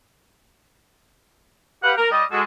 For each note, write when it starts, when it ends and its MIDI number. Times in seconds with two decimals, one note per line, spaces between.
1.84 1.93 67
1.84 1.93 71
1.84 1.93 77
1.84 1.93 78
1.98 2.10 70
2.12 2.24 55
2.12 2.24 75
2.32 2.42 56
2.32 2.42 66
2.32 2.42 69